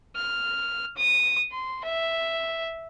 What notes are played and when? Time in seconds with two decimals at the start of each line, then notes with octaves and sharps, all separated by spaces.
0.16 F6
0.97 D#6
1.52 C6
1.84 E5